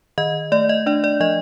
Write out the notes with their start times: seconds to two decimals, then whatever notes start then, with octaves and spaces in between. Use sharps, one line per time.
0.18 D#3 D#5
0.52 A3 D5
0.69 D#5
0.86 D4 D5
1.04 D5
1.20 F3 D#5